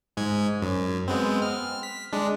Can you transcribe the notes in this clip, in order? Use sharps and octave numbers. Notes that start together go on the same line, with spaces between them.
G#2 G#3 G#6
F#2
G#3 B3 C4
F6
B6
G#3 D4